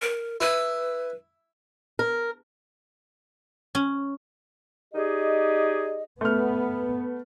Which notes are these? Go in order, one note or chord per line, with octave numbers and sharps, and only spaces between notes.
A#4
E4 B4
A#4
C#4
D#4 G4 G#4 D5 D#5
A3 B3 F6